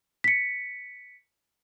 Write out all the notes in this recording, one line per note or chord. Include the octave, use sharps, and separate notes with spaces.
B6 C#7